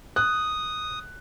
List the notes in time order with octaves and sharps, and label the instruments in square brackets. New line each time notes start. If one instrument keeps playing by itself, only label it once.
[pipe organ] D#6 [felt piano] F#6